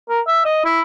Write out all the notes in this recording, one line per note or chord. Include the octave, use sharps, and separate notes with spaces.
A#4
E5
D#5
E4